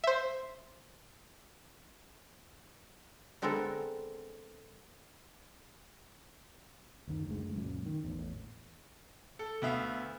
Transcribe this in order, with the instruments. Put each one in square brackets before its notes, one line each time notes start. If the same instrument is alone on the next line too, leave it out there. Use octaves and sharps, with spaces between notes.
[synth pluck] C5 E5
[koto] D3 G#3 B3 C4 A4 A#4
[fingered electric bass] F#1 D2 D#3
F#1 D2 G#3
C#2 F#2 A#2
D#3
A1 E2
[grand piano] A4
D2 B3 E5 F5